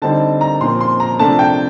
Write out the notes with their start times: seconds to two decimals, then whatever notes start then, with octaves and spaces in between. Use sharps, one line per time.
0.02 D3 G3 C4 D#4 A5
0.41 A#5
0.61 A#2 F3 C4 C6
0.81 C6
1.00 A#5
1.19 C3 F3 A3 D4 A5
1.39 G5